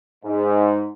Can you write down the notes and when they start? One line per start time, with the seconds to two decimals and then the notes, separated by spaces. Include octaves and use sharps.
0.24 G#2